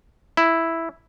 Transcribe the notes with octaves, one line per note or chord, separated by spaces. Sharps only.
E4